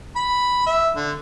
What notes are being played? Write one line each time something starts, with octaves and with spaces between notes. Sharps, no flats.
B5
E5
D3